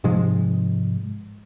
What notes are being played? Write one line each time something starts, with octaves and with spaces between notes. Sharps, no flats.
G#2 C3 F3 G#3